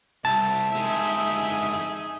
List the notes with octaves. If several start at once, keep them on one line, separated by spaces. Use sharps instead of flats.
C2 E5 A5
F2 G#3 D#4 G#4